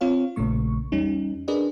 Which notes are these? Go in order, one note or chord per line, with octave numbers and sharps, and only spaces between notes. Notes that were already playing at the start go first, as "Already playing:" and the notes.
C4 F4 C#5 F5
A#1 A#2 C#3 A3 C#6
E2 G3 C#4 D#4
D4 G#4 A#4 B4 D5 D#5